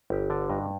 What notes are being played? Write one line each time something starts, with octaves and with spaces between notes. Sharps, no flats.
G1 G4
D3 D5
G2 D#5